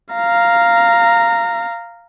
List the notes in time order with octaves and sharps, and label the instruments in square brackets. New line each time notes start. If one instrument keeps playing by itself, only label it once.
[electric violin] F5 A#5